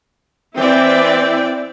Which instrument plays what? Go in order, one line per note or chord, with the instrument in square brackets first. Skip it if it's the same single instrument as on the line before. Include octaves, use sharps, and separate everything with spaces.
[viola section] E3 C4 E4 D5 E5 G5